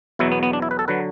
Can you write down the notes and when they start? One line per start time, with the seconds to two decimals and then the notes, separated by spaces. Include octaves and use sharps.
0.19 E2 B2 F#3 E4
0.32 B3
0.43 B3
0.53 D4
0.62 E4
0.71 B4
0.79 A4
0.88 D3 F#3 B4